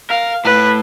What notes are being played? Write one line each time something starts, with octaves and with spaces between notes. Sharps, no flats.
A#4 F5
A2 B4